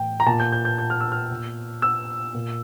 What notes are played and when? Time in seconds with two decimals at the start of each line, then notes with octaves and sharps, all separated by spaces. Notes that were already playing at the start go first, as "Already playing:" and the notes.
Already playing: A2 E3 G5
0.20 A#5
0.26 A#2 A5
0.40 G6
0.52 G6
0.65 G6
0.78 G6
0.90 F6
1.01 E6
1.12 F6
1.31 A#2
1.82 E6
2.34 A#2